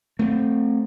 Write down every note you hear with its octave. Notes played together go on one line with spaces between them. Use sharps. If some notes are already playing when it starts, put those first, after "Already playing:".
A3 C4